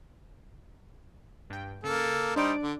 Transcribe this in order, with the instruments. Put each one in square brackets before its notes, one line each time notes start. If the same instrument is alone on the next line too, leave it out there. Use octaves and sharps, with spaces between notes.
[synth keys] G2 G5
[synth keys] C#3 [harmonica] A#3 A4
[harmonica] G3 D#4 C5 [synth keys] D4 D5 D7
[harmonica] D3